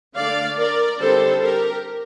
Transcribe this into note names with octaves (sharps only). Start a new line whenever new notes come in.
D3 A3 D4 D5 F5
A#4 D5
D3 G3 C4 D#4 A4 C5
G4 A#4